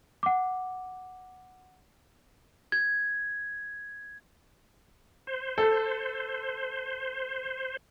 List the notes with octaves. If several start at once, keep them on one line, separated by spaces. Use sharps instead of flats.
F#5 D6
G#6
C5
A4